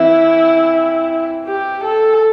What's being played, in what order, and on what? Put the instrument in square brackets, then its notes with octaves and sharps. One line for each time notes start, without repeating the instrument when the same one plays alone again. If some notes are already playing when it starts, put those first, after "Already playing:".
Already playing: [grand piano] E3 C4 [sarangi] E4
[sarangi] G4
A4